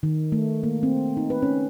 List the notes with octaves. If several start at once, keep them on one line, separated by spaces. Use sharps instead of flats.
D#3
A3
A#3
C4
D#4
B4
C#4